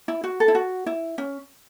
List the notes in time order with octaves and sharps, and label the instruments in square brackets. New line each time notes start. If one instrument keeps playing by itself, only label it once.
[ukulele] E4
F#4
A4
E4
F#4
E4
C#4